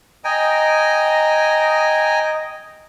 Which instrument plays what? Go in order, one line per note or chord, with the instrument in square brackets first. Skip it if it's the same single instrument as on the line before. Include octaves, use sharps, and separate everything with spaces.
[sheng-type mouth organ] D#5 [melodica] G5 G#5 A#5